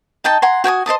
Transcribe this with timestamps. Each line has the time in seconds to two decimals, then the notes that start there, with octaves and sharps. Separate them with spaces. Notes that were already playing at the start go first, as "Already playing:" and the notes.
0.24 D#4 D#5 G5 A5
0.42 F#5 G#5 A#5 C6
0.64 F#4 G5 G#5 D#6
0.86 C5 D#5 A5 D#6